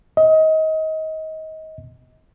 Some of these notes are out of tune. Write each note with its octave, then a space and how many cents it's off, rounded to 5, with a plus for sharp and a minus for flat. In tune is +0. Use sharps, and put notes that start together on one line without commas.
D#5 +25